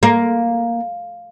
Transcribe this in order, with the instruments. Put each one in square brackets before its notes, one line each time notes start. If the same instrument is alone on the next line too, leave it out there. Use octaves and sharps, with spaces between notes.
[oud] A#3